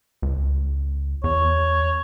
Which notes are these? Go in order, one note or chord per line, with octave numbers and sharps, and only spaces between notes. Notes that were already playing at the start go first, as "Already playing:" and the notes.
C#2
E2 C#5